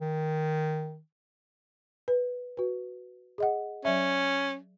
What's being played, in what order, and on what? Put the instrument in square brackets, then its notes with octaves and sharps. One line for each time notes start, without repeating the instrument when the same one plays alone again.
[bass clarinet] D#3
[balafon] B4
F#4 B4
G#4 D#5 F#5
[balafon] F#3 D5 E5 [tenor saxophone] C#4